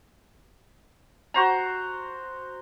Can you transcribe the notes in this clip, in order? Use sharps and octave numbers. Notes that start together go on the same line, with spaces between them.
F#4 C5 A#5